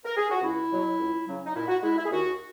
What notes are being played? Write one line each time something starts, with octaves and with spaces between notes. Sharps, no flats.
A#4
G#4
F#4
C#2 E4
B2 F#3
C#2
C#3 F#3
D#4
A#2 E4
F#4
G#3 E4
E4
G#4
D#2 F#4